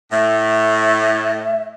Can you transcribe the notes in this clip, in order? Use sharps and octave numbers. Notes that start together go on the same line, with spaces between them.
A2 E5